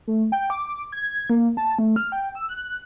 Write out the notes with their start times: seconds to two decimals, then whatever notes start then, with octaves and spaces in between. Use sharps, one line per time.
0.07 A3
0.32 G5
0.50 D6
0.92 G#6
1.30 A#3
1.57 A5
1.79 A3
1.96 F6
2.12 G5
2.35 E6
2.49 F#6